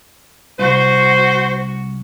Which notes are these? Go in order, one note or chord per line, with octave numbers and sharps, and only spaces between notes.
C2 F#4 C5